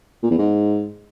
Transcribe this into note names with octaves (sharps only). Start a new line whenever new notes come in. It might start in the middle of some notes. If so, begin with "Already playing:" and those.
A#2
E2
G#2